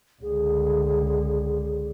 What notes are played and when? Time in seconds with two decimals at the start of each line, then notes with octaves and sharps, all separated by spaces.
0.22 C#2 D3 G#4